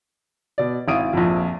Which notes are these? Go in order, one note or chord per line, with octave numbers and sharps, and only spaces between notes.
B2 D5
G#1 E4 F5 D#6 D7 D#7
A#1 F2